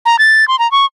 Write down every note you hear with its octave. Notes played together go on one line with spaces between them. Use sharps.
A#5
A6
C6
A#5
C#6